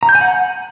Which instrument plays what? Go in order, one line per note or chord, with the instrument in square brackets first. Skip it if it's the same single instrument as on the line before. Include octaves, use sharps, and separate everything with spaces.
[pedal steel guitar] A#5
G6
G#5
F#5